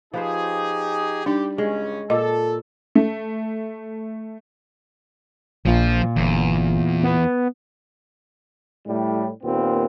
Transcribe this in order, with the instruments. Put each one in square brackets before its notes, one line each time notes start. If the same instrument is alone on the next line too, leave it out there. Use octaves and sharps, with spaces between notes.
[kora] F3 B4 C5 [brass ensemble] D#4 G4 G#4
[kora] G3 [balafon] D4 D#4 [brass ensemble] G4
[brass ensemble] C#2 G2 C#4 [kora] G#3
[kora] A#2 [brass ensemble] A4 [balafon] D#5
[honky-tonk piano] A3
[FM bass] A#1 [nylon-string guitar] A#2 F4 [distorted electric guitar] F3
[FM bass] G1 [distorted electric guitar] E2
[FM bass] B3
[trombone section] A2 G3
D#2 A#2 B3 C4